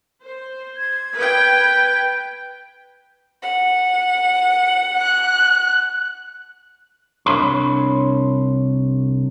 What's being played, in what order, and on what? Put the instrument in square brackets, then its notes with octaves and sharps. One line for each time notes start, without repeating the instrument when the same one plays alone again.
[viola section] C5
[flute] G#6
[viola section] B4 G5
[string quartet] F#5
[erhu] F#6
[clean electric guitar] C2 D4 C#5 B5 C6